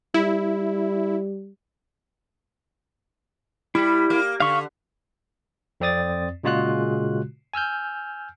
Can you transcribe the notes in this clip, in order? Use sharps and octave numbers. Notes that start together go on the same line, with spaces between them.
G3 E4
G3 E4
A#3
D3 F5 C#6
F2 C4 D5 D#6 A6
A#2 C#3 G#3 F4 F#4 F#6
G#5 E6 F6 G6